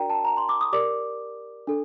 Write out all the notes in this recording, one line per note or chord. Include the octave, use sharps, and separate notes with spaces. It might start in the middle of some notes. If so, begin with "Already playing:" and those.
Already playing: D4 F#4 A#4 D5 G5 A#5
A5
A#5
C6
D6
D#6
G4 A#4 D5 D6
D4 A4